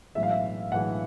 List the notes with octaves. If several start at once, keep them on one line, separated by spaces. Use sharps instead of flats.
B1 A2 E3 G#3 E5
F5
E5
B1 A2 E3 G#3 F#5